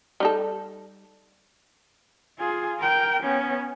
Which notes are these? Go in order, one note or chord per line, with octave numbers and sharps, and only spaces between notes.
G3 D#4 A4
F4 G#4
A#4 G5
B3 C#4